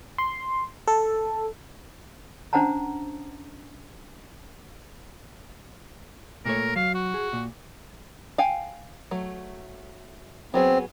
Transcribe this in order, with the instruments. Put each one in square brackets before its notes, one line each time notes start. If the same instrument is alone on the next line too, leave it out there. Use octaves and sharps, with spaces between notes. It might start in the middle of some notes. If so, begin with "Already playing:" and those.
[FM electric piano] C6
A4
[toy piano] C#4 D4 C5 F#5 A5 A#5
[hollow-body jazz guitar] A#2 A3 C#5 [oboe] A#4
[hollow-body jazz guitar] F#3 [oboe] F5
[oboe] F#4
[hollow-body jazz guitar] G#4
A#2
[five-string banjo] F5 G5 G#5
F#3 A3
[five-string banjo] F#3 B3 G#4 [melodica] C4